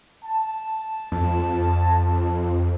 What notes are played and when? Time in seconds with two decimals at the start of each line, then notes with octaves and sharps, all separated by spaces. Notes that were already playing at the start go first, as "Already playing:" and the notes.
0.24 A5
1.12 F2